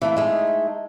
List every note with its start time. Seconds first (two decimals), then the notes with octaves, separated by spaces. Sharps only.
0.02 E3 A3 A#3
0.16 G#3 A3 D#4